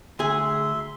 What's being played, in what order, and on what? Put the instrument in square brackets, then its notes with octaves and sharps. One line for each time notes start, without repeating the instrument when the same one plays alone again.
[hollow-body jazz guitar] D2 G#4 [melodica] E5 C6